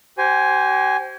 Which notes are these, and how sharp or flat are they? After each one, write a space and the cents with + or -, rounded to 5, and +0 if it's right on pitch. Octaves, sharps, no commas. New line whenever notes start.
G4 -45 C5 +0 G#5 +0